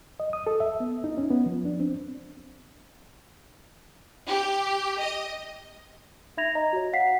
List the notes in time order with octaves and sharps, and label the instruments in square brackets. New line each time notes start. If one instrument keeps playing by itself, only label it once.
[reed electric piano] D#5
D#6
A4
E5
B3
D#4
C#4
B3
F3
D4
C4
[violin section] G4
D#5
[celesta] D#4 E5 B5 G#6 A#6 F7
D#5 A#5
F#4 C#5
F5 F#5 B6 C7